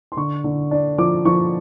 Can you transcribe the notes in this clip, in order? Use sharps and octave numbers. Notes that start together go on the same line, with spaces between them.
C6
D3 C#6
D3
D4
F3 D6
F3 C#6